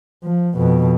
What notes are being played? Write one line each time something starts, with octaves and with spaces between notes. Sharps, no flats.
F3
F2 B2